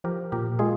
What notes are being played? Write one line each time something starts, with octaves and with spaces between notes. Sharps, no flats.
F3 G4 A#4
A#2 G4 A#4
G#3 F4 G#4